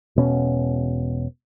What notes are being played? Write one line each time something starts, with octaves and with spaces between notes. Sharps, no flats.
E1 B2 C#4